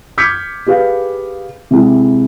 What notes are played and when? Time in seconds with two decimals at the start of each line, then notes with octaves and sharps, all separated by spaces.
0.18 D6 F6 G6 G#6 B6 C#7
0.67 G4 G#4 B4 F5
1.71 C3 G#3 E4